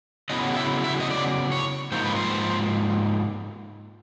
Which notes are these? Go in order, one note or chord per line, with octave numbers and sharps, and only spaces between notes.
C#3 F#3 B3 E4 D#5
E5
E5
D#5
D5
C#5
G#2 F3 A#3 D#4 C5
B4
C5